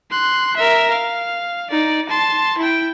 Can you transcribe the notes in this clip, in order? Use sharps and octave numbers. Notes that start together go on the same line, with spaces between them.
C6 F#6
A#4 E5
F5
D#4 D5
A5 C6
E4 G5